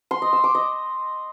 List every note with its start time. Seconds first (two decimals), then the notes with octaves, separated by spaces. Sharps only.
0.11 C6
0.22 D#5
0.33 E6
0.44 D6
0.55 D#5